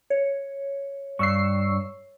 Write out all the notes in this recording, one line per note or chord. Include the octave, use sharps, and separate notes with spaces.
C#5
G2 C#6 E6 C7